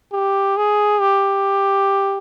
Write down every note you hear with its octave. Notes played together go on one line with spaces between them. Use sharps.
G4
G#4
G4